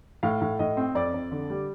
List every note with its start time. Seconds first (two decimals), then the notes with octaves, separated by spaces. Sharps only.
0.23 A2 F5
0.41 A2
0.59 A2 D#5
0.77 C4
0.95 F2 D5
1.14 F2
1.31 D3
1.50 G3